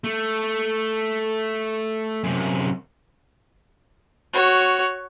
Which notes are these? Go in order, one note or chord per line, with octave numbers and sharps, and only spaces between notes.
A3
F#2 C3
F#4 C#5